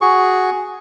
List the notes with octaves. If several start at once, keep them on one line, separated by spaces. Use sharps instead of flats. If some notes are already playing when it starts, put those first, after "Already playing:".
F#4 G#4 C#6